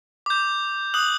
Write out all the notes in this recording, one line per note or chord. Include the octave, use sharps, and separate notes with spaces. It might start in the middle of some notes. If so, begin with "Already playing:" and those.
D6 G6
D#6 F#6 F#7